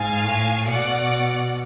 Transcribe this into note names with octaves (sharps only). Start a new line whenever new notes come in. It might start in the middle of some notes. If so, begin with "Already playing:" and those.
Already playing: G#2 F5 G#5
A2
B2 D5 F#5